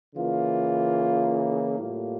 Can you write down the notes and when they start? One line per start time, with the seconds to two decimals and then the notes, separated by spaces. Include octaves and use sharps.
0.15 C#3 E3 A#3 F4
1.79 A2 G3 A#3 F4